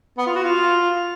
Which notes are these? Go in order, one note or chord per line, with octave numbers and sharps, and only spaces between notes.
B3
F4
F#4
F4